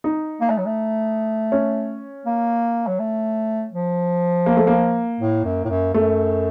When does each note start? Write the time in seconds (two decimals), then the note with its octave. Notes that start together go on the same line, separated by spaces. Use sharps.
0.04 D#4
0.41 A#3
0.50 A3
0.58 F#3
0.66 A3
1.52 C#4
2.26 A#3
2.87 F#3
2.99 A3
3.73 F3
4.46 A#3
4.57 A3
4.67 A#3
5.20 A2
5.45 F#2
5.65 A2
5.69 F#2
5.94 F#2 A3